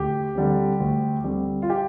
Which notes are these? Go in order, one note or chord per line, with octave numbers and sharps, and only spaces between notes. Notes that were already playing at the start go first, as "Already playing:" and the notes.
Already playing: D2 G4
D3 G3 C4
D2
D3 G3 C4
F4
G4